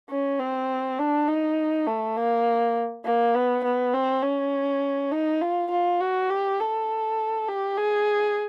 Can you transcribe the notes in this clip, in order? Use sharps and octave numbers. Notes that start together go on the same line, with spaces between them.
C#4
C4
D4
D#4
A3
A#3
A#3
B3
B3
C4
C#4
D#4
F4
F4
F#4
G4
A4
G4
G#4